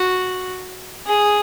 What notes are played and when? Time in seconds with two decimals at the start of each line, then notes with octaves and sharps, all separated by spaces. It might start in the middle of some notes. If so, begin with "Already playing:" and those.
Already playing: F#4
1.06 G#4